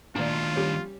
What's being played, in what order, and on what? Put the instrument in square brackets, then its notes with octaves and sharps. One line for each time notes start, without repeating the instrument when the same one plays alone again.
[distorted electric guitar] D#2 D4 [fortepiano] A#2 D5 [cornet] F4
[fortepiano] G3 C#4